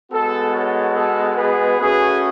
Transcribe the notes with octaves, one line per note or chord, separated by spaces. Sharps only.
G#3 B3 F#4 A4
A4 C#5
A4
G#4 B4
A3 C#4 F#4 G#4 B4